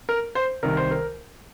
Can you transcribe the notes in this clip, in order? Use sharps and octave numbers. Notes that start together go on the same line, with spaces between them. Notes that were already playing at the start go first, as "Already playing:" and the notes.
A#4
C5
C2 C3 D#3 A#4
C5
A#4